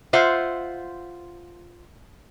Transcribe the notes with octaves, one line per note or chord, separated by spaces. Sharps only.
F4 C5 E5 F#5